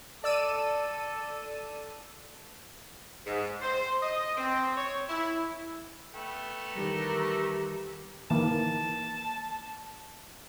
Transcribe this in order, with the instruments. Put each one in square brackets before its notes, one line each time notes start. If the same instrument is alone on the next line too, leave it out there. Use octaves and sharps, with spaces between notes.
[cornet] A4 [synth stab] D5 E6 D#7
[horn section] G#2
C5
D#5
C4
C#5
E4
[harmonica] A3 B3 [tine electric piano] G5
[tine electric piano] D#3 E3 G3 [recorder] G4 [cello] A#4
[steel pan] D#3 E3 A#3 [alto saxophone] A5